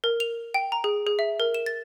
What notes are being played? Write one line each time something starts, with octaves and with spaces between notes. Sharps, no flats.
A#4
F7
G5
A#5
G#4
G#4
E5
A#4
E7
A6